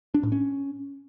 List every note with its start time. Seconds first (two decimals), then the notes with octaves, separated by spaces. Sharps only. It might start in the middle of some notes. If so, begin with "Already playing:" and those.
0.14 D4
0.23 A2
0.32 C#4